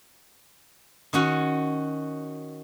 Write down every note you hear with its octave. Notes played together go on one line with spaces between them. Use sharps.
D#3 C#4 F#4